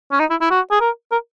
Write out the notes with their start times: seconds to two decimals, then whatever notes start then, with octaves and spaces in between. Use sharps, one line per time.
0.11 C#4
0.20 D#4
0.30 E4
0.41 E4
0.51 F#4
0.71 G#4
0.80 A#4
1.11 A#4